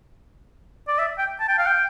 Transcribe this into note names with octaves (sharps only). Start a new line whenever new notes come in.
D5
E5
G5
A5
G5
F5
G5